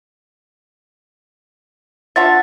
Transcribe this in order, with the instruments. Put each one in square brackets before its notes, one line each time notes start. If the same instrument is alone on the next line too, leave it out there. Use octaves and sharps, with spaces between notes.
[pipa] D4 F4 E5 [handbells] F#5 A6